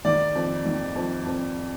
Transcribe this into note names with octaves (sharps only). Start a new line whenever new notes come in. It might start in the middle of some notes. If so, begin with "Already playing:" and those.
D#3 D5
F2
D#3
F2
F2